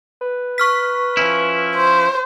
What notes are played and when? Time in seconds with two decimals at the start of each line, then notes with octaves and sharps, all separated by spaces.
0.21 B4
0.58 C#6 F6 B6
1.17 F3 C#4 E4
1.75 C5